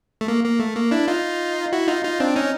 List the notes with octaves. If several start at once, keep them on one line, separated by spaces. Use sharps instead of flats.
A3
A#3
A#3
A3
A#3
D4 E4
D#4 F4
E4 F#4
D#4 F4
D#4 F4
C4 D4
C#4 D#4